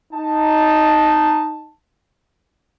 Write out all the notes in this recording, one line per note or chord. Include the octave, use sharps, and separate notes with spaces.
D#4 A5